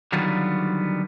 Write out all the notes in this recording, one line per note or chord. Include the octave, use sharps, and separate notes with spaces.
D3 D#3 F#3 G3 B3 F4